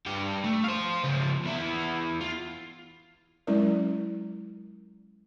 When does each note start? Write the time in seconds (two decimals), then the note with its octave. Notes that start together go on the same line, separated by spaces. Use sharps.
0.06 G2 G4
0.44 A3
0.64 C5 F5
1.04 C#3 F3
1.45 E2 E4
2.21 F4
3.47 F#3 G#3 C#4 E4 A#4 D5